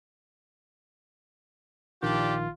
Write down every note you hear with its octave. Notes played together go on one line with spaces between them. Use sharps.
A#1 D#3 D4 F4 G4